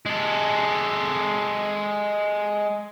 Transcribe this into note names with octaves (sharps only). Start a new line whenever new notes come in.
G#3 A4